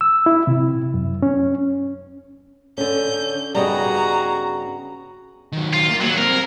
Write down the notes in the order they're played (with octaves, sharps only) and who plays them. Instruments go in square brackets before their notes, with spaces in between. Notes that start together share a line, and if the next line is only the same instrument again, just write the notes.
[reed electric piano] E6
E4
C3
F#2
C#4
[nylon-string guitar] D3 C#4 [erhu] G6
[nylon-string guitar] G2 C#3 [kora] G3 B3 D#4 [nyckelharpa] F#4 G#4 [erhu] A#5
[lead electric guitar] D#3 F#3
[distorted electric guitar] F4
[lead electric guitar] A#3
[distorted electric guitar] F#3 [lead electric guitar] G3 A#3
[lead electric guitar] G3 C4 [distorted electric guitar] A#4